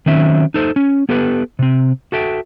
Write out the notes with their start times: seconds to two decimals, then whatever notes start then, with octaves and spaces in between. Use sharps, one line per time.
0.06 D#3 F#3 C4 C#4 E5
0.54 D#4 A4 C5
0.76 C#4
1.09 B3 G4 A4 B4
1.59 C3 C4
2.12 F#4 A4 E5 G5